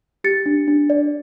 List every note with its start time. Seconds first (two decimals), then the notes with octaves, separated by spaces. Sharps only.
0.24 G4 A6 C#7
0.46 D4
0.68 D4
0.90 D5